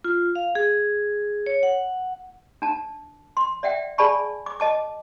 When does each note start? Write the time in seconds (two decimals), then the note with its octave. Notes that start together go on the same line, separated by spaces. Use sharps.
0.04 F4
0.35 F5
0.55 G#4
1.46 C#5
1.63 F#5
2.62 D4 A5
3.37 C6
3.63 D5 E5 F#5 G5
3.98 G#4 D5 G#5 A5 B5 C#6
4.46 D6
4.60 D#5 A5 D6